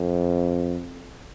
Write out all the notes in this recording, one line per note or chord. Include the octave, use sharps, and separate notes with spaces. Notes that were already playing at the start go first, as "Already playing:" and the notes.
Already playing: F2